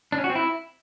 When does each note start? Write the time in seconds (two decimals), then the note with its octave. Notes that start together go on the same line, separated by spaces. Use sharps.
0.12 D4
0.18 C#4
0.24 F#4
0.30 C4
0.35 E4